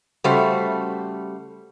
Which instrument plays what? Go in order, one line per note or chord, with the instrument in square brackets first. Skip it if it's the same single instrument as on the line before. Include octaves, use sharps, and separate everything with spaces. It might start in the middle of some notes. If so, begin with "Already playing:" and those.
[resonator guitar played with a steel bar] C#3 G3 A3 F#4 C5